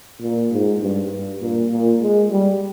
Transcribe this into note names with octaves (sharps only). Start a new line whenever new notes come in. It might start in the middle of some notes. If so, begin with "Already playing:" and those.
A#2
G#2
G2
G2
A#2
A#2
G#3
G3